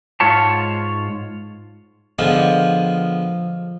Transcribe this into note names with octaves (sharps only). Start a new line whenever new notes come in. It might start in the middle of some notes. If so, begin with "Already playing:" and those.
G#2 F4 C#5 A5
D3 F3 G#3 B3